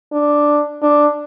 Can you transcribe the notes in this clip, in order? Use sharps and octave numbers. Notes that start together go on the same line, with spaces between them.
D4
D4